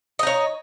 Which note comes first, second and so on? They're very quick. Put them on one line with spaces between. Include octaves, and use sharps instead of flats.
D#5 D#4 C#5